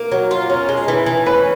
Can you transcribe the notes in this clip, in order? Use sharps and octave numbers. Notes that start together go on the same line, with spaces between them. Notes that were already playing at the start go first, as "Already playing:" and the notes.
Already playing: A#3 A#4
F#3
F4
C#4
G#3
E3
E3
C#4 B4